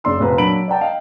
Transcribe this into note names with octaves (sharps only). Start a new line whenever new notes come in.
F#1 C#3 D5 C6 E6
F1 A#2 B4 A#5
F#3 A#3 D4 B5 D7 F#7
D5 F#5 G5 A5
D#5 F5 G5